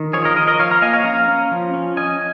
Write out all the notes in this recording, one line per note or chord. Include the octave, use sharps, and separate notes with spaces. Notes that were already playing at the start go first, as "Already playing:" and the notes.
Already playing: D#3
F3 G#4 C#5
A#4 D#5
F3 A#4 D#5
A#4 D#5
F3 C#5 F5
F5 A#5
A#3 D#5 G#5
C#5 F5
C#4 F5 A#5
C#4
F3
C#4
C#4 D#5 G#5